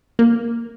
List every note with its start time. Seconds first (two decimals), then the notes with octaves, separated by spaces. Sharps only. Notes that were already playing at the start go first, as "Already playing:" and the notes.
0.19 A#3